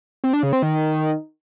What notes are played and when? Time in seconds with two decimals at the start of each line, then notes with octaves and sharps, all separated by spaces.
0.24 C4
0.33 D4
0.43 C#3
0.53 C4
0.62 D#3